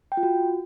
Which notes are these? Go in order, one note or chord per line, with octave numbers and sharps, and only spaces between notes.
G5
F4
F#4